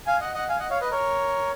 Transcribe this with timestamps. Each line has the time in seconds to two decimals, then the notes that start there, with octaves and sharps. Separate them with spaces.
0.06 F5 G#5
0.21 D#5 F#5
0.34 D#5 F#5
0.49 F5 G#5
0.59 D#5 F#5
0.70 C#5 F5
0.81 B4 D#5
0.91 A#4 C#5